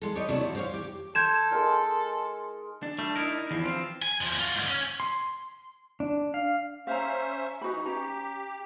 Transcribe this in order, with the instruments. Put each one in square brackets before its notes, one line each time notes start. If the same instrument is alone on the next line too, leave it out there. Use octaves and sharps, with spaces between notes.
[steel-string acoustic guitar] G#3 A4
G4 A4 B4 C#5 D#5
C3 F#3 A3 D4 E4
G#2
G4 C5 C#5 D#5 F5
G4
[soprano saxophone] A4 [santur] C6 [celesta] G6 G#6 E7
[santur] G#3 D#4 A#4
[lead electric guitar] D4
[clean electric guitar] G3 A3
D#4 E4 A#4
[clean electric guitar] E2 [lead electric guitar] E3 F3
[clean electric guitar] C4 F4
[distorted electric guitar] G#5
E2 F3
F4 F#4
G#2 D3
C#4
[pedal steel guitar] C6
D4
F5
[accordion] C#4 C5 E5 [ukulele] F5 A#5
[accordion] E3 D#4 [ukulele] F#4 B5
[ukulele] C#4 A#5 [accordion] G4